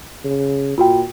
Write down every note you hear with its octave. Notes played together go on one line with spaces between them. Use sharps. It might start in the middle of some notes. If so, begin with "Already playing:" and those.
C#3
A#2 F4 F#4 G5